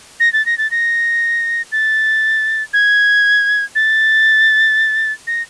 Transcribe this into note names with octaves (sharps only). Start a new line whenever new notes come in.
A#6
A6
A#6
A6
A#6
A6
G#6
A6
A#6